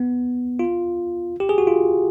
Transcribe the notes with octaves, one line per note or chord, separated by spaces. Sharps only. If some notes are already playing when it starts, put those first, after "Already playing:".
Already playing: B3
F4
G4
G#4
F#4
F4